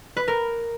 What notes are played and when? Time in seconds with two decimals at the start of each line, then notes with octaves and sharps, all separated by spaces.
0.17 B4
0.28 A#4